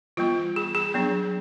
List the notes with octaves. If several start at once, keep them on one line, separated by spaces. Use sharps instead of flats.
E3 G3 B3 F4
G#4
G#4
F#3 B3 D4